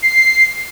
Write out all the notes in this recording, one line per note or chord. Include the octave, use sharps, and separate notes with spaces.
C7